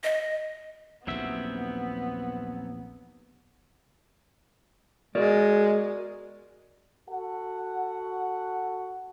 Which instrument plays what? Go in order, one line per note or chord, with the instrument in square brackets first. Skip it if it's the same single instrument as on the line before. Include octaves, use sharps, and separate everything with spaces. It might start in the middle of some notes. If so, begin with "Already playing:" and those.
[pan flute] D#5
[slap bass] A#1 D#2 [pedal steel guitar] F#3 C4 E5 [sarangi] B3
[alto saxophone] G#3 [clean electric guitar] F#4 A#4 D5
[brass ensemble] F#4 A4 F#5